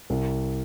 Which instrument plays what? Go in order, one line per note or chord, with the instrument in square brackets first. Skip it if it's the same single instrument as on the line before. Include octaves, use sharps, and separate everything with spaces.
[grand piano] C2